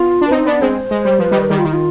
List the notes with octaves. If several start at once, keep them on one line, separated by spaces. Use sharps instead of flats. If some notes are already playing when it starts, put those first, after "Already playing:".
Already playing: B3 F4
D4
B4
C4 D#4 C5
B3 D4 D5
G#3 C4 C5
G#3
G3
F3 B4
D#3 G3
D#3 G3 G4
F4
D#3 D#4
F4